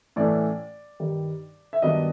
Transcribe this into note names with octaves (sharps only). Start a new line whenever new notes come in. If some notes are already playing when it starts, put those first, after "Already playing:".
A2 E3 A3 C#4 D5
G2 D#3 G3
E5
G2 D#3 F#3 B3 D4 D#5